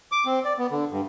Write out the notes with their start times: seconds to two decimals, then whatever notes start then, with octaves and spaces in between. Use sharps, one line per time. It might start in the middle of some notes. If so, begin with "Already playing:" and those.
0.12 D6
0.26 C4
0.45 D5
0.58 B3
0.71 D3
0.91 G2